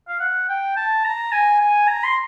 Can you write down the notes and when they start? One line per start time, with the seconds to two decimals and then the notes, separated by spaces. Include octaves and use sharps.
0.08 F5
0.19 F#5
0.48 G5
0.76 A5
1.04 A#5
1.32 G#5
1.59 G#5
1.87 A#5
2.04 C6